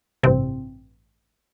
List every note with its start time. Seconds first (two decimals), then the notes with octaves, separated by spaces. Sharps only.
0.23 A1 G2 C3 E3 C4